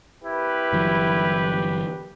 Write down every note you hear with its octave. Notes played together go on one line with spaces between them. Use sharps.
C2 E4 G4 B4
G1 E3 F#3